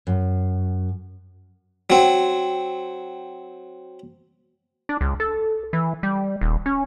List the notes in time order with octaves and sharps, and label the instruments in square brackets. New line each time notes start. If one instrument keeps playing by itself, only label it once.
[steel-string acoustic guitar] F#2
[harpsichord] F#3 C4
[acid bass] D4
C#2
A4
E3
G3
D#1
C#4